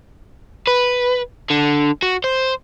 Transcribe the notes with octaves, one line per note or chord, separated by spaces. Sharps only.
B4
D3
F#4
C5